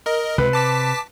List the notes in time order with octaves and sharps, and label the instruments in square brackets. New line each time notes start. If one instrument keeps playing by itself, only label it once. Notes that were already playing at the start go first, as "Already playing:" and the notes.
[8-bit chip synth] A#4 D#5
[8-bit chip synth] C#2 [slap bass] C3 [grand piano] B4
[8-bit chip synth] A5 D6 B6